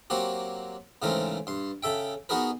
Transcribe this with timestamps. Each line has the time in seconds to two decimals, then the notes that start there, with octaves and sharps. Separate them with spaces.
0.10 F#3 A#3 C4 F#4 G4
1.02 G#2 C#3 E3 A3 C4 A#4
1.47 G2 C6
1.83 C#3 A4 E5 G5
2.29 B3 D#4 F#4 G#4 A#4 B4